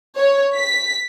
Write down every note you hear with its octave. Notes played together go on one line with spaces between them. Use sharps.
C#5
B6